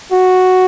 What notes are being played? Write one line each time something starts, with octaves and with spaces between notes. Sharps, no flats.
F#4